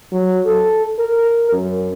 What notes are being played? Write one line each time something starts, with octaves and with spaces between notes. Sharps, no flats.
F#3
A4
A#4
F#2